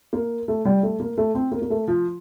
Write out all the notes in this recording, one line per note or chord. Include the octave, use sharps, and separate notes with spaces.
A#3
A3
G3
A3
A#3
A3
C4
A#3
A#3
A3
F3